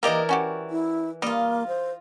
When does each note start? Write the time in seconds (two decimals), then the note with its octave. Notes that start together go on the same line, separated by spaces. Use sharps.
0.03 E3 A#3 G4 A#4 D5 D#5
0.29 C#4 F#4 G4
0.70 E4
1.22 G3 A#3 F4 D#5
1.68 C5